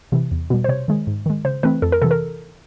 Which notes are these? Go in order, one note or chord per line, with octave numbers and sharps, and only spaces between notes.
C3 E3
E2
B2 G3
C5
C3 C#5
D#3 G#3
G#2
D#3 G#3
C#3 C5
E3 A3 C4 B4
F2 A4
A#4
C3 E3 A4
A#4